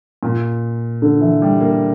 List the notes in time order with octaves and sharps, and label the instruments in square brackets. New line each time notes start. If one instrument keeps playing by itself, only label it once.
[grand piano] A#2
D3
E3
G3
A#3